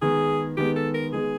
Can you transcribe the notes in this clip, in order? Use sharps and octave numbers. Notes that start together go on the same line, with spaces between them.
D#3 G#3 B3 G#4
D#3 G#3 B3 G4
A4
A#4
D#3 G#3 B3 G#4